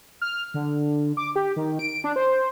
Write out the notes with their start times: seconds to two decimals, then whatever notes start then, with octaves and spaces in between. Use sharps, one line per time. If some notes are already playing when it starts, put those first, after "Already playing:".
0.22 F6
0.54 D3
1.17 D6
1.36 G4
1.56 D#3
1.79 D7
2.04 D4
2.16 C5